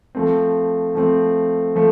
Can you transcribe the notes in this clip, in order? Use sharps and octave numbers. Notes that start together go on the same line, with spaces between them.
F3 A3 C4
F3 A3 C4
F3 A3